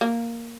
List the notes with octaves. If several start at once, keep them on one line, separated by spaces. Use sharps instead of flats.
A#3